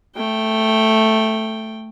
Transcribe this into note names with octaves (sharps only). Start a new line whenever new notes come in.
A3 G5